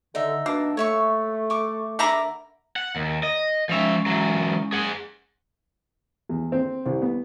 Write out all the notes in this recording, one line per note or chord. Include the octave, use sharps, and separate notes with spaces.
D3 D#4 E5
B2 A#3 D4
A3 C#5 E5 C#6
C#6 D6
D3 A#4 E5 A#5 B5 D6
F#5
D#2
D#5
F3 G#3 C#4 E5 F5
E3 F#3
G#4 F#5
E2
C4
C2
B3